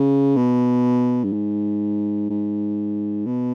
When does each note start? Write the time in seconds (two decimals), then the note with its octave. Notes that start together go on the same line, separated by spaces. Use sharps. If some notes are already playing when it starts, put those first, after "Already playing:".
Already playing: C#3
0.36 B2
1.24 G2
1.33 G#2
2.30 G#2
3.26 B2